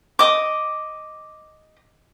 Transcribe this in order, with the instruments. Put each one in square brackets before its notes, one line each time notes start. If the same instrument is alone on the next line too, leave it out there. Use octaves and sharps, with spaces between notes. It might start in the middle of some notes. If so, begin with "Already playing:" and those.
[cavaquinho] D#5 D6